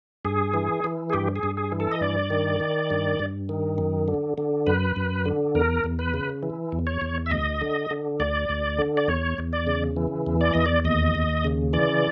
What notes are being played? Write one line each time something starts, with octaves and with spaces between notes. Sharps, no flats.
G2 G#4
E3
E3
G#4
G2 G4
G#4
G2
G#4
E3
A4
D#5
G2 D5
D#3
D#3
G2
G2
D#3
F#2
D3
D3
F#2 B4
F#2
D3
E2 A#4
E2
B4
C#3
E3
E2
C#5
E2
E5
D2 D#5
D3
D3
D2 D5
D2
D3
D5
E2 C#5
E2
D5
C#3
E3
E2
D5
E2 D#5
D5
D#2 D#5
D#2
C#3
E3 D5